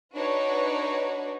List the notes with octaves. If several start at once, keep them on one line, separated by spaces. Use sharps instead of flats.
D4 D#4 F#4 B4 C#5